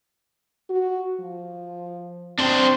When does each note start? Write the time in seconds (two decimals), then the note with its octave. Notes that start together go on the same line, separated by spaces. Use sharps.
0.70 F#4
1.20 F3
2.39 C4 D4 C5